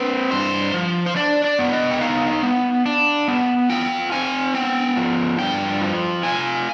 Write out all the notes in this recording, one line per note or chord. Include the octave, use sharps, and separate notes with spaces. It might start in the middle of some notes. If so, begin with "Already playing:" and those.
Already playing: C4 B4
G2 C5
F3
C5
D4 D5
D5
B3
D#5
G5
D#4 F5
B3
D4
B3
F4 G5
C4 G#5
B3 G5
F3
G2 G5
F3
F4 G#5